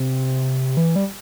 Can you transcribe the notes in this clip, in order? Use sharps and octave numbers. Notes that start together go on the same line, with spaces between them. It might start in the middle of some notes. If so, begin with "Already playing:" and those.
Already playing: C3
E3
G3